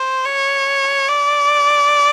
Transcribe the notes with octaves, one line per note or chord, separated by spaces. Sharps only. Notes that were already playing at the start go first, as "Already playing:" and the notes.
Already playing: C5
C#5
D5